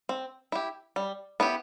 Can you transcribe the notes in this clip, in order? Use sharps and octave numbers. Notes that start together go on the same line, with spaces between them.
C4
E4 G4
G3
B3 E4 G4